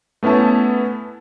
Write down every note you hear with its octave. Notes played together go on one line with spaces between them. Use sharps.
A3 B3 C#4 E4 A5